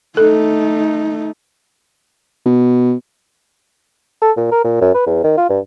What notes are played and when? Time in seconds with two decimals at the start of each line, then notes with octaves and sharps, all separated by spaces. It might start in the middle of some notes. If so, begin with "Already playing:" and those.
0.17 A3 D#4 A4
2.46 B2
4.22 A4
4.37 A#2
4.52 A#4
4.64 A#2
4.81 F#2
4.94 B4
5.06 E2
5.24 D#3
5.38 F4
5.49 G2